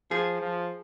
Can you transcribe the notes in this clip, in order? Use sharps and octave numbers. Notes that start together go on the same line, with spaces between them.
F3 G#4
F3